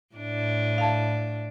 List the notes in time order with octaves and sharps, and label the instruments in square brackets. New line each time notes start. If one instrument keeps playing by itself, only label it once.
[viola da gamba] A2 D4
[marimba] F5 A5